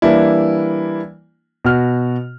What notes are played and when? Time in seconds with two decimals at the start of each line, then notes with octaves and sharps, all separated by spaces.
0.02 E3 G3 A#3 D4 E4
1.64 B2 F#4 F6